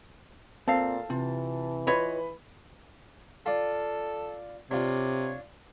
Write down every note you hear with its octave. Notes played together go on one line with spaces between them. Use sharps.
A#2 C4 A4 F5 A5
C3 E3 F4
F4 B4 C#5 D#5 B5
F4 A4 D5
C3 D4 F4 C#5